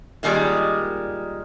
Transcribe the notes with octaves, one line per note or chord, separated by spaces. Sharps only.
A#2 D#3 G3 G#3